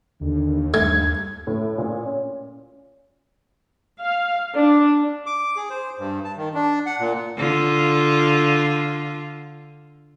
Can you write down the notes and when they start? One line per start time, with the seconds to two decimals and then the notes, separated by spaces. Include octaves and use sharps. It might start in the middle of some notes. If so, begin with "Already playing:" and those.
0.21 D#2 D3
0.74 G2 A3 G#6
1.47 A2
1.78 A#2
2.06 C#4
3.99 F5
4.54 D4
5.26 D6
5.56 G#4
5.70 C5
5.99 G2
6.24 A5
6.37 D#3
6.54 D4
6.86 F#5
7.00 A#2
7.37 D3 F4